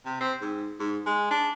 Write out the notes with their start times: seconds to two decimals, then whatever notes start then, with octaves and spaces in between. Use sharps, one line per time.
0.05 C3
0.21 C4
0.42 G#2
0.80 G#2
1.06 G#3
1.31 D4